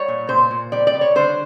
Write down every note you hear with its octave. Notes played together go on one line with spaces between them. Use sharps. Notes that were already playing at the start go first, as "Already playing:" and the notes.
Already playing: G3 C#5
A#2
A#2 C5
A#2
G3 D5
D5
G3
C#5
D3 C5